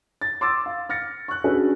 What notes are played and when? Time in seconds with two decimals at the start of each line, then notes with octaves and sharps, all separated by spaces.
0.22 A6
0.41 C6 D6 E6 A6
0.66 F5
0.89 F6 A6 A#6 C#7
1.28 C#6 F#6
1.44 C#4 D4 F#4 G#4 A4 B4